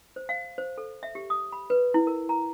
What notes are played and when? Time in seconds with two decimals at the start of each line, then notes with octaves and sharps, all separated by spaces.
0.16 C5
0.29 F5
0.58 C5
0.78 A4
1.03 E5
1.15 G4
1.30 D#6
1.52 B5
1.70 B4
1.94 E4
2.07 A#4
2.29 A#5